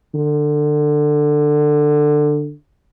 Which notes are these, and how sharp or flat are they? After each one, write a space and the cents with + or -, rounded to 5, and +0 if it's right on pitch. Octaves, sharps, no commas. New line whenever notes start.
D3 +20